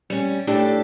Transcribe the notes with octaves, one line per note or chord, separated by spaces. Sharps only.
G3 C#4
A2 D4 G4 A4